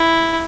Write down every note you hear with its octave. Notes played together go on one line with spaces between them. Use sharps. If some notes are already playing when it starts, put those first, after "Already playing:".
Already playing: E4